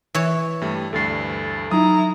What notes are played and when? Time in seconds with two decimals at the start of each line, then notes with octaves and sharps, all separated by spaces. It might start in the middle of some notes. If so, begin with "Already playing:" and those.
0.15 E3 C#5
0.61 G2 G3 A3
0.93 D2 G2 A4 A6 C7
1.71 F#3 D#4 E4 A#5 D#6